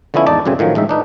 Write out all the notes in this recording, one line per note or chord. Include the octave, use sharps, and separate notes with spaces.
D3 F3 B3 C#4 E4
G#1 E2 D#4 D5 A5
F#2 A2 C#3 C4 G#5
A2 D#3 F3 F#3
A1 G#2 D#4 E5
D4 D#4 B4